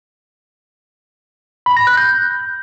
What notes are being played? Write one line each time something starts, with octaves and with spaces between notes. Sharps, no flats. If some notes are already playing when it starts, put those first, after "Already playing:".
B5
A#6
F#6
G6